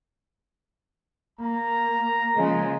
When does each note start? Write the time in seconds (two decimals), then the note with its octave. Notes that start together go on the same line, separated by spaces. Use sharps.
1.40 A#3 A#5
2.36 C#3 F3 G#3